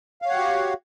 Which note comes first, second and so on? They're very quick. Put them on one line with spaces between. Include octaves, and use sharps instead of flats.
F5 C#5 F#5 G4 F#4